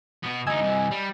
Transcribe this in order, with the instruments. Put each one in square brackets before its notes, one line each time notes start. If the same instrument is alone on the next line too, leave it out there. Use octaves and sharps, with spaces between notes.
[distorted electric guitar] B2 B3
[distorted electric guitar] D2 D#4 [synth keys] D#5 G#5 E6
[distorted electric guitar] C2 E3
G3